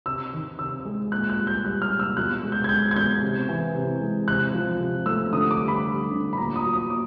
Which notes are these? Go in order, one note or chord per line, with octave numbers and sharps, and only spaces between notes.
C3 E6
D#3
C3 E6
G#3
A#2 F#6
F#6
G3
G6
G3 F#6
F6
A#2
E6
B2 F#6
G#3
G6
G#6
G#3 G6
G#6
B2 G6
C3
E3
C3
G#3
C3 F#6
F3
C3
A3 E6
D3 D#6
D6
G3
B5
G3
D3
B5
A#2 A#5
D#6
F#3
D#6
A#2 D6